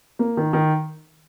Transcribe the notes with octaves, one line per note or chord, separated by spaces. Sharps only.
A#3
D#3
D#3